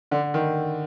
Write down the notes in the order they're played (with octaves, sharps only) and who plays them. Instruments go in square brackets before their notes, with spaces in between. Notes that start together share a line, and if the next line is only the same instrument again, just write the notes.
[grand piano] D3
D#3